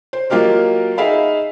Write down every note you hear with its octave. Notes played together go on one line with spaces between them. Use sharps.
C5
F#3 A#3 F4 G4 A#4 D#5
D#4 G#4 E5 F5 B5